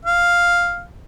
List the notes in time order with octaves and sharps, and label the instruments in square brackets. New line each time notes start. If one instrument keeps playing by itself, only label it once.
[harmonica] F5